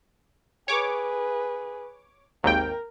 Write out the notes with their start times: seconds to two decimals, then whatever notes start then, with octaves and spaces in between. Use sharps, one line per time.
0.68 G#4 B4 C#5 D6
2.44 G#1 D#2 A#4 G5